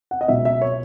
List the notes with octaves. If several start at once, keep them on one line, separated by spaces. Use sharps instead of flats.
F#5
D#5
C#2 B2 F#3 E5
E5
C#5